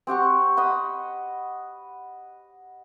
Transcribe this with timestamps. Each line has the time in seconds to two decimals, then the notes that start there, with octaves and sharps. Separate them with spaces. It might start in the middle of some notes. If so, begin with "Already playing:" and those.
0.07 C4 G4 F#5 C#6
0.57 D#5 F#5 B5